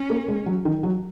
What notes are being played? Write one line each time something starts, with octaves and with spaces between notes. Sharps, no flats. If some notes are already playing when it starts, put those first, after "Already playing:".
Already playing: C#4
A#3
G#3
F#3
D#3
F#3